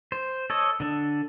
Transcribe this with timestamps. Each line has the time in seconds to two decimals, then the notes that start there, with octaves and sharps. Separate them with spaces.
0.12 C5
0.50 A4 C#5 D#5
0.80 D3 D4